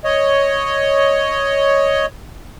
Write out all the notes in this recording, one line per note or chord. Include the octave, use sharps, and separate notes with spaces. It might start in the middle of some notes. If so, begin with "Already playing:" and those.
C#5 D#5